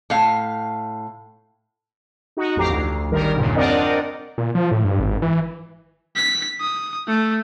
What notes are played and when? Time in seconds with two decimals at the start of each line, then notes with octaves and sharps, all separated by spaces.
0.10 A2 F5
2.37 D#4 F#4
2.56 A1 F2 G4 A#5 D6 C7
2.70 D2
3.11 G#1 D#3 G3 A#4
3.36 E2 G2 A#2 C#3
3.56 C4 D4 A#4 D5 D#5 F#5
4.38 A#2
4.55 F3
4.71 A2
4.84 G2
5.00 G#1
5.22 E3
6.16 B6
6.60 D#6
7.08 A3